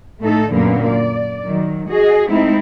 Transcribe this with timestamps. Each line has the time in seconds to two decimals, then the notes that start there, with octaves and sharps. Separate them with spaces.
0.20 A2 A3 D#4 A4
0.51 F#2 A#2 D3 A#3 B3
0.86 D5
1.45 D#3 F#3
1.89 F#4 G#4 D#5
2.28 G#3 A3 C4 D#4 E4